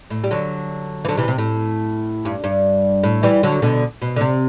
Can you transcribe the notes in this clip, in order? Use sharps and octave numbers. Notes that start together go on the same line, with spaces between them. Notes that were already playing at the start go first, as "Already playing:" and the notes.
A2
G3
D3 F#3
E3
D3 F#3
C3 E3
C3
A2
G2
G2
A2
E3 G3
D3 F#3
B2 D3
B2
D3
C3